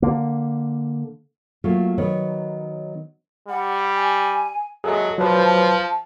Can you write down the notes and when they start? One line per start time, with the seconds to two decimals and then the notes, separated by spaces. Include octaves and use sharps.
0.02 D3 A#3
1.64 F#3 A3 A#3 F4
1.98 D#3 F#3 B3 C#5
3.48 G3 F#5
3.95 G#5
4.84 F#3 G#4 A4 D#5 E5
5.18 F3 F#3 B4 C5 A5